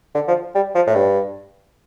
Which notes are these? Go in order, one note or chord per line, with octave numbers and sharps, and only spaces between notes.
D3
F3
G3
F3
A2
G2